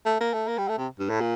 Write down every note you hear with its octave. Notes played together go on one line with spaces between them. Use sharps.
A3
A#3
A3
A#3
G3
A3
C3
G2
A2
A#2